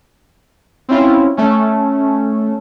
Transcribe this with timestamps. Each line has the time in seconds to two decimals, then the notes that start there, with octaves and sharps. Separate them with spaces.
0.89 C4 C#4 E4 F4
1.37 A3 C#4